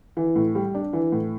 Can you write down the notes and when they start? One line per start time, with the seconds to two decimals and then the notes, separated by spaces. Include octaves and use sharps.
0.17 E3
0.36 A2
0.55 G3
0.74 D4
0.93 E3
1.12 A2